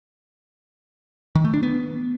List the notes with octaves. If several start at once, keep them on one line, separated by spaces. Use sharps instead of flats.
D#3
A3
D4
B3